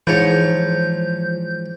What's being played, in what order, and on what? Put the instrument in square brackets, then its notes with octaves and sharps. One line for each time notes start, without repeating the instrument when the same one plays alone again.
[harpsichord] G#2 C#5 [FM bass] E3 [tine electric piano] F3 [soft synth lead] G6